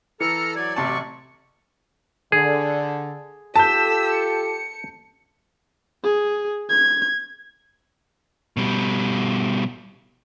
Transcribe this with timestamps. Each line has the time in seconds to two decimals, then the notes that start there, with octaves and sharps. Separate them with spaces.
0.20 E3 A4 A#5 F6 C#7
0.56 F#3 D5 G#6
0.76 A1 C3 A5 C#6
2.32 D3 G#4
3.56 F4 G4 A4 A5 E6 G6 B6
4.11 C#7
6.04 G#4
6.70 G#6
8.57 B2 G3